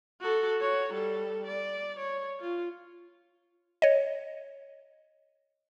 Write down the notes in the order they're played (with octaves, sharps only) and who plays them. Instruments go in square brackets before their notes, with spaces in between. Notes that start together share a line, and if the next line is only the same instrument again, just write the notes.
[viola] F#4 A4
F#4 C#5
G3 A4
D5
C#5
F4
[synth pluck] C#5 D#5